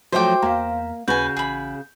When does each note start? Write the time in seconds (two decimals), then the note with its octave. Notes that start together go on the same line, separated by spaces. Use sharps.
0.12 F3 F#3 A3 F#4 C5 E5 G5 D6
0.42 E2 A#3 F5 A#5
1.08 D#2 C#3 F#4 B4 G#5 G6
1.37 A1 G#4 B5